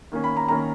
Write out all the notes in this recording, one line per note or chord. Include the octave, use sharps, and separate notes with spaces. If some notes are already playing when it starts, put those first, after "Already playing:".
D#3 A#3 C#4
B5
A#5
D#3 A#3 C#4 A#5